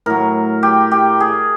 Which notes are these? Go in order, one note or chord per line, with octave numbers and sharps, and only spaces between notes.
A2 F#3 A#4
G4
G4
G#4